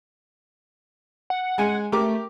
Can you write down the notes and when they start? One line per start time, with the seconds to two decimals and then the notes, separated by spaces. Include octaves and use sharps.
1.30 F#5
1.58 G#3 G#5
1.92 A3 G4 A#4 D6